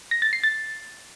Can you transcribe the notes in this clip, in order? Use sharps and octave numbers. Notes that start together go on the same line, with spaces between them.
A#6
A6
C7
A6